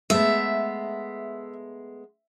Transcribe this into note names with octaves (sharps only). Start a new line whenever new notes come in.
G#3 A3 B3 E5